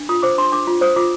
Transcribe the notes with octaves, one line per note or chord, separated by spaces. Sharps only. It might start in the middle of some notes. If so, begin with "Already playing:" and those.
Already playing: D4
F4 D#6
C5 D6
D4 C6
D4 D6
F4
C5 D#6
F4 D6